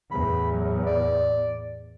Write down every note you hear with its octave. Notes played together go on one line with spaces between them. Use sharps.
E2 A2 B5
F#3
D5